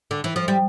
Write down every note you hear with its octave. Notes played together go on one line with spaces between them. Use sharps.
D3
E3
F3
G3